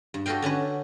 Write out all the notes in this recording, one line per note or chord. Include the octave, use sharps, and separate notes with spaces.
G2
F#4 G4 A4 D#5 F5 G5
D3 C#4 F#4 B4